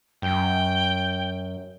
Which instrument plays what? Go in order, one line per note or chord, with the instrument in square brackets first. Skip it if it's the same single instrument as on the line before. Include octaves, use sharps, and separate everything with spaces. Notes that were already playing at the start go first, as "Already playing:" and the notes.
[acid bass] F#2 [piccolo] G5